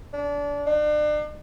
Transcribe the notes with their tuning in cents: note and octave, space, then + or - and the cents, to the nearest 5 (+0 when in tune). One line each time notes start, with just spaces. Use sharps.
D4 -25
D4 +40